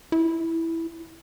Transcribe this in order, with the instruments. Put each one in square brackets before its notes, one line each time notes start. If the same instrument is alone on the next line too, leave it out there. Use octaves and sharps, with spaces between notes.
[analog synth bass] E4